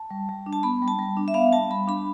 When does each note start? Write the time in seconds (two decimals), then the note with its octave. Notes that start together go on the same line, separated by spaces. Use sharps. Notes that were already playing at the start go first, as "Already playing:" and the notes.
Already playing: A5
0.10 G3
0.29 G3
0.46 D4
0.53 A5
0.63 B3 B5
0.82 G3
0.88 A5
0.99 G3
1.17 D4
1.28 E5
1.34 B3 F5
1.53 G3 A5
1.70 G3 B5
1.88 D4 B5